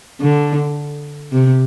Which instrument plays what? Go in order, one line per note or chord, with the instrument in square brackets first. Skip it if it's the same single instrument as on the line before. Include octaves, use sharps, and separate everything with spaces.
[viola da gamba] D3
C3